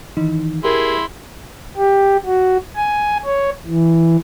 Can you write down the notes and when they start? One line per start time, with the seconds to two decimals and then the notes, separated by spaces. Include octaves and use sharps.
0.17 D#3 E3 D#4
0.64 E4 G4 G#4 A#4 C6
1.77 G4
2.25 F#4
2.76 G#5
3.25 C#5
3.66 E3